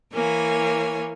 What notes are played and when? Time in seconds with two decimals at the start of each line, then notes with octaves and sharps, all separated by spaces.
0.13 E3 A#3 C#5 G#5